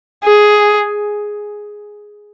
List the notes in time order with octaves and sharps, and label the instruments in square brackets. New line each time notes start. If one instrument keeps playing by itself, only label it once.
[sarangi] G#4